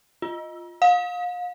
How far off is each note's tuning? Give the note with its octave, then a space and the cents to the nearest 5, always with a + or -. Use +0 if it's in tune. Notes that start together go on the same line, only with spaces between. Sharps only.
F4 +5
F5 +30